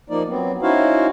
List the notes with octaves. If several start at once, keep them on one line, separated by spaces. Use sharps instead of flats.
F3 A#3 D#4 D5
F#3 B3 C4
C#4 D#4 E4 F#4 C5 F5